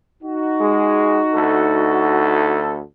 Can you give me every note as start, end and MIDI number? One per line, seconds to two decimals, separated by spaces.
0.23 2.59 63
0.23 2.59 66
0.60 1.19 56
1.34 2.79 38
1.34 2.79 69